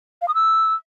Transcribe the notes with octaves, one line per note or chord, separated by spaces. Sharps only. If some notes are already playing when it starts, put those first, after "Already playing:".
F5
D#6
E6